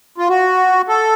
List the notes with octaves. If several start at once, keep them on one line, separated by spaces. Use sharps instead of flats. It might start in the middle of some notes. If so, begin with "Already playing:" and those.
F4
F#4
A4